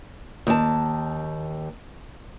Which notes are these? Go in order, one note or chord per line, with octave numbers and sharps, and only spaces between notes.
D#2 A5